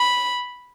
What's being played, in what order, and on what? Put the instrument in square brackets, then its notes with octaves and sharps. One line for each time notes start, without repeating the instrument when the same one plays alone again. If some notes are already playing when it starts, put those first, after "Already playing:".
Already playing: [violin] B5